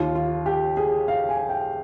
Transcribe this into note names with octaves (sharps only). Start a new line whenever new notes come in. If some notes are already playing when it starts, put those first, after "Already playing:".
Already playing: D#2 D#3 F4
F4
G4
G#4
F5
G#5
G5